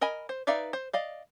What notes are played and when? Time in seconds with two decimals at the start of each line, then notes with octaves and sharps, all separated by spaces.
0.01 A#4 D#5 G#5 B5
0.29 C5
0.47 D#4 B4 D5 E5 F5
0.73 C5
0.93 D5 D#5 F5